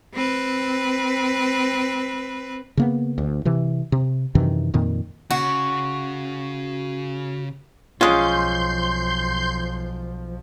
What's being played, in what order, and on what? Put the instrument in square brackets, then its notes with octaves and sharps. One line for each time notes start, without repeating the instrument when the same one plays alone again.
[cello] C4 B4
[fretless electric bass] C#3 A#3 B3
D2
C3 E3
C3
F#2 C3 D#3 E3
F2 A#2 D#3
[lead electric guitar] C#3 [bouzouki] F#4
[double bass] B1 F3 [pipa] G#3 C#4 [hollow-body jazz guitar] F4 [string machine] C6 G6